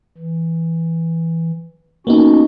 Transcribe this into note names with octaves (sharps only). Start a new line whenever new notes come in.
E3
A#3 B3 C#4 D#4 F#4